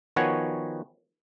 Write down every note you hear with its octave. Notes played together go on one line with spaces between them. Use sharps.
D#3 F3 B3 F#4 C#5 G#5